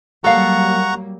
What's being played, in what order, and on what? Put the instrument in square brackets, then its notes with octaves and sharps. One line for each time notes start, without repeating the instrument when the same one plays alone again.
[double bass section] F#3 G3 A#3 [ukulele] A4 F5 [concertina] F#5 A#5 C#6